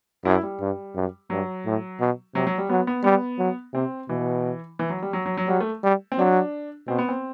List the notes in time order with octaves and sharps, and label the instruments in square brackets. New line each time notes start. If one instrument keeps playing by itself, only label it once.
[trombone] F#2 [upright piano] E4
[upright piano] G3
[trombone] G2
F#2
[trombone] G2 [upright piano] F#3
[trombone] A2
B2
[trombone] C3 [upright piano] F#3
[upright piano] F#3
G3
[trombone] F#3 [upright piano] B3
[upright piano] B3
[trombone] G3 [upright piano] B3
[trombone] F#3
[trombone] C3 [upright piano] C4
[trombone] B2 [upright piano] E3
[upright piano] E3
F#3
G3
F#3
F#3
F#3
[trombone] F#3 [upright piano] G3
[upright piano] A3
[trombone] G3
[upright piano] C4
[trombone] F#3 [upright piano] D4
[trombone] B2 [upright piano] C4
[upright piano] B3
C4